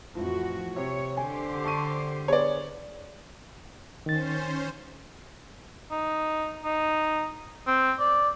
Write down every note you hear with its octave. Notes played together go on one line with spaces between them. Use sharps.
F2 A2 E3 F3 F#4
C3 C#5
D3 G4 C5 G#5
A5 C#6 D#7
B3 G#4 C#5 D5
D#3 C#4 C5 A6
D#4
D#4
C4
D5